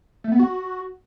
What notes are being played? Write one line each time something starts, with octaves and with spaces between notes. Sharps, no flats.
A3
B3
F#4